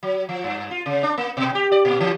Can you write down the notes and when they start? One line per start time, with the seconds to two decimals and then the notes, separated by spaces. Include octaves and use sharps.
0.03 F#3
0.29 F3
0.44 G2
0.71 F4
0.86 C#3
1.03 D4
1.18 A#3
1.37 B2
1.55 G4
1.72 D5
1.85 A#2
2.00 E3